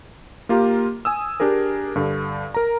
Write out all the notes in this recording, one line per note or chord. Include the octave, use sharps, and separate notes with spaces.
A#3 F4 G4 A#5
G#5 D#6 E6
D4 G4 G#4 A#4
G2 D3
A#4 A#5